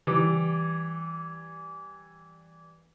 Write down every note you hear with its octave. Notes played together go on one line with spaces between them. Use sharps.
E3 G3 D6